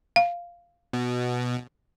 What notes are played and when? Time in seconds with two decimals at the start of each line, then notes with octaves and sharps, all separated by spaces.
0.16 F5
0.93 B2